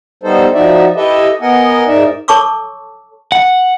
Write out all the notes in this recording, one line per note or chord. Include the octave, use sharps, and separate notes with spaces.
G3 B3 D#4 A4 C5
F3 D#4 F#4 D5 E5
E4 G4 A4 B4 D#5 E5
B3 A#4 D#5 F#5 G#5
G#2 D#4 A#4 D5 E5
A4 C#5 A5 C#6 D6 E6
F#5